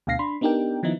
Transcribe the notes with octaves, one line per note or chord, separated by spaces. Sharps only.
D2 B2 D3 F5 A#6 C7
D4 B5 C6
B3 D4 D#4 G4 A#4 G5
D#3 F3 B3 D#4 E4